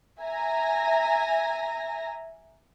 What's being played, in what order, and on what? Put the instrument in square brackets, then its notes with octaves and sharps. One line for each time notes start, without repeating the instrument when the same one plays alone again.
[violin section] E5 G#5 A#5 A#6